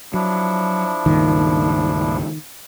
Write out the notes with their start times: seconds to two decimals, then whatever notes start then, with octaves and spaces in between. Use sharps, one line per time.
0.14 F3 F#3 D4 E4
1.06 C#2 G2 A#2 D#3